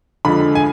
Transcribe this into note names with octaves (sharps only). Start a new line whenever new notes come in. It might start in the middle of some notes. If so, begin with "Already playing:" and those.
F2 D3 G#3 B5
G#5